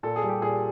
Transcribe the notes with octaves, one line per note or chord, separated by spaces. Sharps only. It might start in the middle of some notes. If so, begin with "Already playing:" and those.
A#2 A4
G#4
G3
G4
A#2 G#4